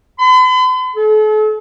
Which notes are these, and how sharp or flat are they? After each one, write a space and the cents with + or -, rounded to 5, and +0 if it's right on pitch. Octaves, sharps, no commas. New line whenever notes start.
B5 +45
A4 -40